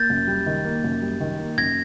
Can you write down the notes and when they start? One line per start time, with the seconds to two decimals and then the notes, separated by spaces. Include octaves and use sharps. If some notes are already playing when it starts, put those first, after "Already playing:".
Already playing: A#3 G6 A6
0.10 F#2
0.28 G3
0.47 D#3
0.65 A#3
0.84 F#2
1.02 G3
1.20 D#3
1.39 A#3
1.58 F#2 G#6 A#6